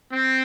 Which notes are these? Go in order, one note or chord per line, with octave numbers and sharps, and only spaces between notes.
C4